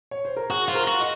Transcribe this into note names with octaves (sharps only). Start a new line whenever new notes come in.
C#5
C5
A#4
F#4 G#4
F4 C5
A#4
F#4
D#5